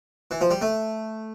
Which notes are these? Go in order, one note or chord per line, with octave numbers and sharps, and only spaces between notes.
E3
F3
G3
A3